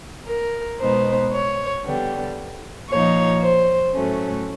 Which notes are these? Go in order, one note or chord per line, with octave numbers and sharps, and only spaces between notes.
A#4
B2 G#3 B3 D#4 C5
C#5
D3 G3 B3
A#2 F3 A#3 D#4 C#5
C5
A2 F#3 A3 C#4